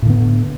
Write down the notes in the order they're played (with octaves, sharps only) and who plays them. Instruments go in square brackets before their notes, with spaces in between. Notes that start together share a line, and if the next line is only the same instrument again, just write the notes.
[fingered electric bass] A2
D3
B3